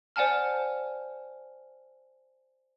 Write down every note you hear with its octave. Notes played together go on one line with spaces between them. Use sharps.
C5 D5 F#5 G#5 A5 F6